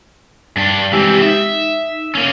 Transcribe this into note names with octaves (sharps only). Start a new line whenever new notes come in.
G2 D4
E3 G#3 C4 G4 E6
D#4 E5
A#3 C#4